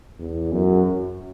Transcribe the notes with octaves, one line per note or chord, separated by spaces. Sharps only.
E2
F#2